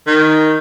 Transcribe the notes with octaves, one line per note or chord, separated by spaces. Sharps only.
D#3